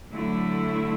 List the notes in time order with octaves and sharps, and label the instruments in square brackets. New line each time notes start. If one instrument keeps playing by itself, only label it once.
[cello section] D3 F#3 A3 E4